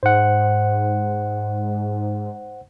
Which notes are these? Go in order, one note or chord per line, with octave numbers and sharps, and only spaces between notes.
G#2 C5 F#5